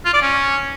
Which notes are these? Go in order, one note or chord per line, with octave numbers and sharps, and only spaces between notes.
F4
D5
C#4